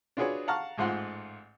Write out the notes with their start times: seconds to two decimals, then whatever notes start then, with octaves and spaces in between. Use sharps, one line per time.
0.17 D4 F4 F#4 G#4 B4 C#5
0.48 F5 F#5 A5 A#5 C#6 F6
0.78 A1 G#2 F4 F#5 C6